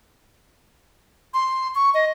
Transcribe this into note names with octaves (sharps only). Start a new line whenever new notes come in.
C6
C#6
D#5